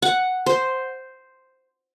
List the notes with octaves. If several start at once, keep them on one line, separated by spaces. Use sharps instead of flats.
F#5
C5